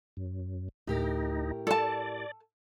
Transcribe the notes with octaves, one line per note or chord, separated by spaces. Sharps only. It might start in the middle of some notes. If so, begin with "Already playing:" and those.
F#2
D2 A2 D#4 G4 A#4
A4 D5 A5